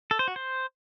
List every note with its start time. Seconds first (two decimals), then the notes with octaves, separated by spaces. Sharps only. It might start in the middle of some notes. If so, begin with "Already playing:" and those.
0.11 A4
0.19 C5
0.28 F#4
0.36 C5